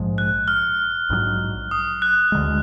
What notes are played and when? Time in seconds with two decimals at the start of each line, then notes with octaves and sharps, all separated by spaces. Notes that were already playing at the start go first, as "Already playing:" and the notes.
Already playing: A#1 G#2 F3 G#3
0.18 F#6
0.48 F6
1.10 A#1 G#2 D#3 F#3
1.71 D#6
2.02 F#6
2.32 D2 D3 G#3